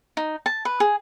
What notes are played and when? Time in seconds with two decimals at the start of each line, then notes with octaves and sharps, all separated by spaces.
0.17 D#4
0.46 A5
0.65 B4
0.80 G#4